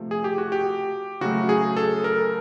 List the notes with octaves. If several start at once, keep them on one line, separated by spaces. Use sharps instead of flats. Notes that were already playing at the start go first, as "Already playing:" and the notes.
Already playing: C3 F3 A3
G#4
G4
F#4
G4
C#3 F#3 A3 F#4
G#4
A4
A#4